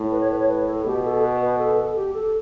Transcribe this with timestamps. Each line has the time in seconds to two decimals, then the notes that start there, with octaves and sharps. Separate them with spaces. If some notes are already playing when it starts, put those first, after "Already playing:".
Already playing: A2
0.11 B4
0.21 C#5
0.30 B4
0.39 C#5
0.48 B4
0.67 A4
0.85 B2 G4
1.04 A4
1.23 B4
1.41 B4
1.59 A4
1.77 A4
1.96 G4
2.14 A4